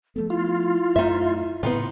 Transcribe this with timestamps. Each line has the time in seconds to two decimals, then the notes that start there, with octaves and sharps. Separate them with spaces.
0.16 F3 A3 B3 A4
0.30 E4 F4
0.96 F#2 A3 D#4 E5
1.63 A2 C#3 B3 D#4 F4